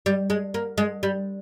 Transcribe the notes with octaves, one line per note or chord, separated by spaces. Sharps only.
G3
G#3
A#3
G#3
G3